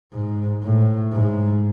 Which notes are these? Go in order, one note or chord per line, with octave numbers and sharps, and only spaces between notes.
G#2
A2
G#2